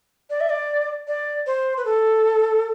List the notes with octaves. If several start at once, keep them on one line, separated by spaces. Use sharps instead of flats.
D5
E5
D5
D5
C5
B4
A4